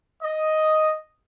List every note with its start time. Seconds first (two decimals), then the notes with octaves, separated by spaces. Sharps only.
0.22 D#5